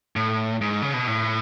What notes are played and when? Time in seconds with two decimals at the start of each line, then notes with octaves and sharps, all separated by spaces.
0.16 A2
0.61 G#2
0.82 C#3
0.94 B2
1.07 A2